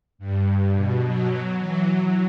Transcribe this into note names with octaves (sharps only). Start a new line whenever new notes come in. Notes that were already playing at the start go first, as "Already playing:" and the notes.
G2
B2
F#3
E3
F#3